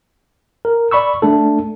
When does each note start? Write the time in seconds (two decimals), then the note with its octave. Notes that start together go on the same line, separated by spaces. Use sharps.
0.65 A#4
0.91 D5 B5 C#6 E6
1.22 A3 D4 A4